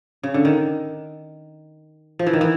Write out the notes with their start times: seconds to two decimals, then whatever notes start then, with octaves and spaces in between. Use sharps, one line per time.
0.23 C#3
0.34 D3
0.45 D#3
2.19 F3
2.27 E3
2.33 D#3
2.41 E3